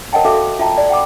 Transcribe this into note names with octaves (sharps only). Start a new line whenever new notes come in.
A#4 C#5 D#5 F#5 G5 A5
F#4 A4 E5 F5 D6
F4 E5 G5 A5 A#5
D5
F#5 G5 B5 D6